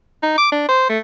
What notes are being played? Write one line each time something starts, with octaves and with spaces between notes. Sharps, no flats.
D#4
D6
D4
C5
A3